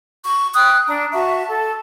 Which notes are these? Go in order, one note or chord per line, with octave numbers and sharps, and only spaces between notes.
C#6
G5 D#6 F#6
D4 A#5
F#4 E5 A5 C#6
A4